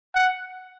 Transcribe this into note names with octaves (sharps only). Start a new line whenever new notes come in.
F#5